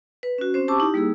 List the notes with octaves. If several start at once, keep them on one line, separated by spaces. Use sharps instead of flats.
B4
C#4 F#4
C4 C#4 C5
G4 A5 C#6 D6 E6
D#4 E4 G4
G3 A#3 D#4 G#4 E6